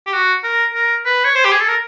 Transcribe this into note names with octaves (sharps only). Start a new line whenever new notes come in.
G4
F#4
A#4
A#4
B4
C#5
C5
G4
G#4
A4
A#4